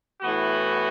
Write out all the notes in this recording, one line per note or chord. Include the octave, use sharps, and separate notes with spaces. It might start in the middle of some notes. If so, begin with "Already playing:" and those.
A2 E3 B3 F#4